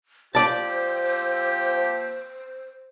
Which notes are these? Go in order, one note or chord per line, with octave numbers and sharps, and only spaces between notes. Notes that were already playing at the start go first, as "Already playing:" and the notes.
F3 A#3 G4 C5 D5 A5